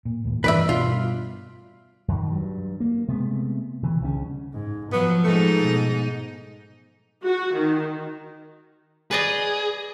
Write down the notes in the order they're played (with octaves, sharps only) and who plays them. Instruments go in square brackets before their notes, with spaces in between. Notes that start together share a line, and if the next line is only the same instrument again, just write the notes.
[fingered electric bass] A#2
D#2 A2
[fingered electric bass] G2 E3 [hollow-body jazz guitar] B4 D5 E5
[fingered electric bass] G2 B2 [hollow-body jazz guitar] F4
[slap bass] F#2 D#3
G2 F#3
A#3
C3 G#3 A3 B3
C3 D#3 E3
C2 C#3 C#4
[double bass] G#2
[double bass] F3 [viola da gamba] F#3 [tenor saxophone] B3
[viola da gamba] G#2 D#4 [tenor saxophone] A3
[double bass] B2
[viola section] F#4
D#3
[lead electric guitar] G#4 [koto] B4 D5 D#5